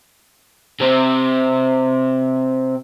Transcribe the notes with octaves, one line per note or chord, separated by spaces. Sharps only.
C3 C4